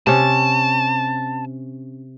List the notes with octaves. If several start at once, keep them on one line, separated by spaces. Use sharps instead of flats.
C3 C#4 A5